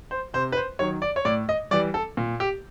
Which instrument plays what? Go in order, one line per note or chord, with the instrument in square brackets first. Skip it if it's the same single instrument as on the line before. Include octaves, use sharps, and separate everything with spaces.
[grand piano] C5
C3 C5
B4
C5
D#3 F#3 C#5
D5
C#5
A2 D5
D#5
E3 G3 D5
A4
A#2
G4